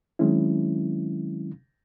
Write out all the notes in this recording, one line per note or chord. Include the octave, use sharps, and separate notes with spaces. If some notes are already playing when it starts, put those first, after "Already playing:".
D#3 F#3 G#3 C4 C#4 E4